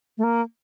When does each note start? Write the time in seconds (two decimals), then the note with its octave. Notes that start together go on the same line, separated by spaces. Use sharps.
0.18 A3
0.24 A#3